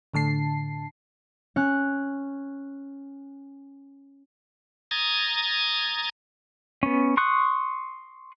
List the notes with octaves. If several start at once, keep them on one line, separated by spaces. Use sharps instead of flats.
A2 D3 A5 C7
C#4 F#6
A#5 D#6 G#6 A6
B3 C#4
C6 C#6 D#6 F#6